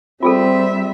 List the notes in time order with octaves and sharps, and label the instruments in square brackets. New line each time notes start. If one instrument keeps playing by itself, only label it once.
[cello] G3 E5 [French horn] C4 [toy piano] F4 G#4 A4